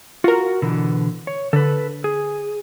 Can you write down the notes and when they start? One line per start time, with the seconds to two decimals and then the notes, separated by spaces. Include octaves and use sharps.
0.24 F4 F#4 A#4
0.62 B2 D3 E3
1.27 C#5
1.53 D3 A4 B4
2.04 G#4